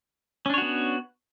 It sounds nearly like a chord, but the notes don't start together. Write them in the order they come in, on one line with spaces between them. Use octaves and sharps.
C#4 D4 C#5 F#4 B3